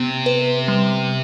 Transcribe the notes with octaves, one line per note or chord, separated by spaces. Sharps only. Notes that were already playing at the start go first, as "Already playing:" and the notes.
Already playing: C3 B3
B4
G3